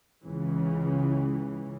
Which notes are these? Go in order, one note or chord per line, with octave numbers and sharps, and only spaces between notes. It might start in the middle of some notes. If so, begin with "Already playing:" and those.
C#2 C#3 E3